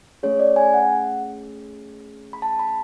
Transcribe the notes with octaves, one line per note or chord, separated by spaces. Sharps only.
A3 C#4 G#4 C#5
D5
G#5
F#5
B5
A5
B5